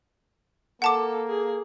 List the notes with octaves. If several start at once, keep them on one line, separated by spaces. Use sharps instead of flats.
A#3 A4 F#5 A5 D6
G#4